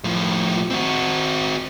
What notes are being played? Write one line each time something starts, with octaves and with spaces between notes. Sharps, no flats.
A2 F3
C4 F#4